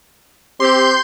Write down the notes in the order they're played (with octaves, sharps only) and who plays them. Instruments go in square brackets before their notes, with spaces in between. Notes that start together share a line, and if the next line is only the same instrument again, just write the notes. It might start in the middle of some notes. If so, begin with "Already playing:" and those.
[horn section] C4 G4 [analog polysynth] C6 G6